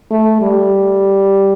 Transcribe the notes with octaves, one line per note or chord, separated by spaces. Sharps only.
A3
G3